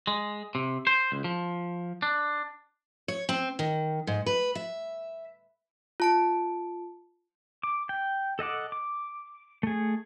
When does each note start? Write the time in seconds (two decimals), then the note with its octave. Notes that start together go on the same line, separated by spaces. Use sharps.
0.07 G#3
0.55 C3
0.87 C5
1.12 C#2
1.24 F3
2.02 D4
3.08 C#5
3.29 C4
3.59 D#3
4.07 G#2
4.26 B4
4.55 E5
6.00 F4 A5 D7
7.63 D6
7.89 G5
8.39 A4 D#5 F#5 D6
8.72 D6
9.63 A3 G#4